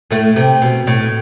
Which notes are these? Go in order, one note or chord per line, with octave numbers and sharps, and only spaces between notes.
A2 A3
C3
B2
A2